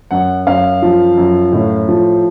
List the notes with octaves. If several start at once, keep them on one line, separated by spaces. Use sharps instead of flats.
F#2 F#5
F#2 F5
F3
F#2
A2
F3